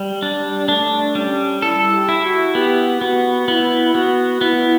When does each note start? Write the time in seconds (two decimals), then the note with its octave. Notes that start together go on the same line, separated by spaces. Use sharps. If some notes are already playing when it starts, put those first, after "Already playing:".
Already playing: G3
0.22 D4
0.38 G3
0.68 A3 D4
1.15 G3 C#4
1.62 E4 A4
1.93 G4
2.09 E4
2.24 F#4
2.54 B3 G4
3.01 B3 F#4
3.48 B3 E4
3.95 B3 F#4
4.41 B3 E4